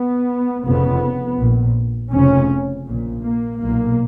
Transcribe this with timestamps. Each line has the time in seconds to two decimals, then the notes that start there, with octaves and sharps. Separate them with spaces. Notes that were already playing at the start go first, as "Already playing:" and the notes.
Already playing: B3
0.64 F1 F2 C#3 B3
1.37 A#1 A#2
2.11 F1 F2 C#3 C#4
2.86 A#1 A#2
3.23 A#3
3.59 B1 A#2 A#3